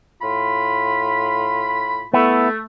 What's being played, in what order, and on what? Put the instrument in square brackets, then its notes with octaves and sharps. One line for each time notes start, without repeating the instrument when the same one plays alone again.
[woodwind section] A2 F4 B5
[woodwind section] A3 [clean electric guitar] B3 E4